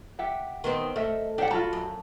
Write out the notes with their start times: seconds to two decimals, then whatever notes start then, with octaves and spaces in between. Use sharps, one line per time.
0.19 G4 E5 F#5
0.64 D#3 B3 C4
0.96 A3 A#4 D#5 E5
1.38 D4 G4 C5 F#5
1.51 F4 F#4 A4 B5
1.73 F#2